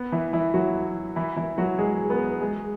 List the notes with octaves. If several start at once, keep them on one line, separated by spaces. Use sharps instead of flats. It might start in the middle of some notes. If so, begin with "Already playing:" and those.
Already playing: B3
E3 E4
E3 E4
F#3 F#4
E3 E4
E3 E4
F#3 F#4
G#3 G#4
B3 B4
G#3 G#4